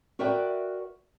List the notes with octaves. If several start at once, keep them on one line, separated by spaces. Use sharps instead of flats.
F#4 A#4 B4 D5 E5 G5